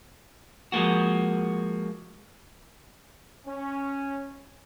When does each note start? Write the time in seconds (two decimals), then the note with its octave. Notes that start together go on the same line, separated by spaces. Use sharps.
0.72 F3 G#3 A#3 F#4
3.47 C#4